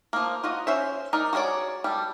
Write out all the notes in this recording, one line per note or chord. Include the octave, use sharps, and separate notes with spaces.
F3 A#3
F4 F#4 D#5
C#4 C5 E5
D#4 A#4 D5
F#4 G#4 A#4 C#5 D5
G3 A4